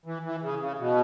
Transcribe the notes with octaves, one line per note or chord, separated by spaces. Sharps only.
E3
E3
C#3
C#3
B2